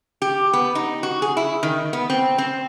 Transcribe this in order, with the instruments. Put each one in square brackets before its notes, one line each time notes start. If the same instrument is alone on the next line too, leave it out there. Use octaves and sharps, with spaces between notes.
[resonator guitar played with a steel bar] G4
B3
D#4
F#4
G#4
E4
D#3
B3
C4
C4